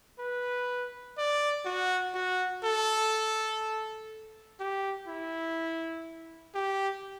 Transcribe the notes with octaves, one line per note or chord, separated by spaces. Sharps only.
B4
D5
F#4
F#4
A4
G4
E4
G4